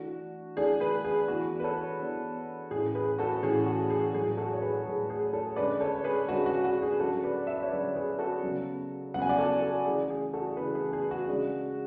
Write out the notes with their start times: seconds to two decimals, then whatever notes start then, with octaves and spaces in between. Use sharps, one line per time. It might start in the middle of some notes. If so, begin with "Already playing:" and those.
Already playing: E3 A3 D4 F#4
0.57 E3 A3 D4 G#4
0.80 G#4 B4
1.05 G#4
1.28 E3 B3 D4 F#4
1.60 B4
1.64 A4 C#5
2.00 E3 B3 D4
2.71 A2 E3 A3 C#4 G#4
2.95 G#4 B4
3.18 F#4 A4
3.43 A2 E3 A3 C#4 G#4
3.66 F#4
3.90 G#4
4.14 A2 F#3 A3 G#4
4.37 F#4 A4
4.53 C#5
4.62 G#4 B4
4.86 A2 F#3 A3 G#4
5.10 G#4
5.33 A4 C#5
5.56 D3 G#3 C#4 B4 D5
5.81 A4 C#5
6.04 G#4 B4
6.28 D3 G#3 C#4 F#4
6.46 F#4
6.65 F#4
6.82 G#4
7.00 D3 F#3 C#4 F#4 A4
7.23 B4 D5
7.47 E5
7.55 D5
7.62 C#5 E5
7.71 D3 F#3 C#4 B4 D5
7.95 G#4 B4
8.19 F#4 A4
8.42 C#3 F#3 B3
9.14 C#3 F#3 B3 F#5
9.22 G#5
9.29 D5 F#5
9.38 F#4 A4
9.62 F#4 A4
9.85 C#3 E3 A3 G#4
10.10 G#4
10.33 F#4 A4
10.57 C#3 E3 A3 G#4 B4
10.75 G#4 B4
10.93 G#4
11.11 F#4
11.28 C#3 G#3 D4